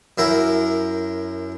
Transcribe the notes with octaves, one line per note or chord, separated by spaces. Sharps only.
F#2 E4 A#4